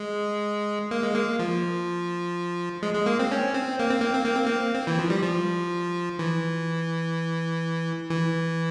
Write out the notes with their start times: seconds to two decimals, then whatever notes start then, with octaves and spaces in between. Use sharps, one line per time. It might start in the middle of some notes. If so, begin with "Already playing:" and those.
Already playing: G#3
0.91 A#3
1.03 G#3
1.14 A#3
1.39 F3
2.83 G#3
2.94 G#3
3.06 A#3
3.19 C4
3.31 C#4
3.54 C4
3.79 A#3
3.90 C4
4.02 A#3
4.13 C4
4.25 A#3
4.36 C4
4.47 A#3
4.75 C4
4.87 E3
4.99 F3
5.10 G3
5.22 F3
6.19 E3
8.10 E3